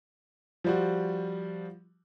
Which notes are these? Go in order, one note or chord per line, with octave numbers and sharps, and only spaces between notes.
F3 G3 F#4